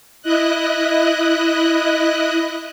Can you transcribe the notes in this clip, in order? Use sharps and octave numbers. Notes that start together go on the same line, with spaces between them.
E4 D#5 F#6